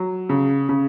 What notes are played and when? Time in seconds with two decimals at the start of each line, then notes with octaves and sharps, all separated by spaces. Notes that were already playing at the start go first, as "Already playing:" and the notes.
Already playing: F#3
0.29 C#3
0.69 C#3